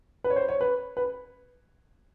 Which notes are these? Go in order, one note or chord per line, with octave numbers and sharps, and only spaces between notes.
B4
C#5
C5
C#5
B4
B4